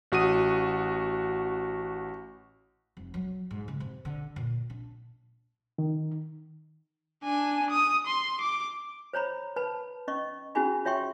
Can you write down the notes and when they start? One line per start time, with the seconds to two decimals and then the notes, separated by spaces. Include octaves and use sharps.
0.12 A1 F#4 D#6 D#7
2.97 F1
3.14 F#3
3.51 G#2
3.68 C#3
3.80 C3
4.05 D3
4.36 A#2
4.70 D4
5.78 D#3
7.24 D4 G#5
7.71 D#6
8.07 C6
8.41 D6
9.13 C5 C#5 A#5 B5
9.56 B4 A5 B5
10.08 C#4 D#5 C#6
10.55 C#4 E4 F#4 G#4 G#5 B5
10.85 F4 C#5 E5 G5 C6 C#6